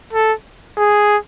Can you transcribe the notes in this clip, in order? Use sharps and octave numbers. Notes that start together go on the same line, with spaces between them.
A4
G#4